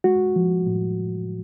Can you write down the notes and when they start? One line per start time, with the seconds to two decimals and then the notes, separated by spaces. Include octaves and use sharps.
0.04 G#3 F#4
0.36 F3
0.67 A2